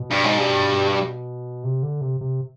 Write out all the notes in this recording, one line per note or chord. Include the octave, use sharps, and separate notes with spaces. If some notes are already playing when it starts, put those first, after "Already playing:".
Already playing: B2
G2
G#2
G2
C3
D3
C3
C3